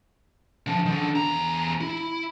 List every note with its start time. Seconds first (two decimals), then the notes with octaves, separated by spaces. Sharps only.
0.67 D3 F3
0.85 D#3 D4
1.16 E2 A#5
1.81 E4